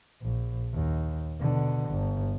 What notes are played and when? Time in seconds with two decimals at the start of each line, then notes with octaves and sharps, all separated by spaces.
0.22 A#1
0.74 D#2
1.41 B2 D3
1.90 G1